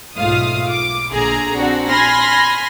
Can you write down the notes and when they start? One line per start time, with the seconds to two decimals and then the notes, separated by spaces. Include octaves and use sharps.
0.17 B1 G#2 A3 F4 F5 D#6
0.70 D6
1.11 A#1 D3 G#4 A#5
1.57 C4 D4 F#4
1.88 G#5 B5 C6 F6 A#6